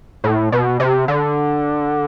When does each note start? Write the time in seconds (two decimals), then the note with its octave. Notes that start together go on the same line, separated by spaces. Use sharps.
0.24 A2
0.52 B2
0.80 C3
1.08 D3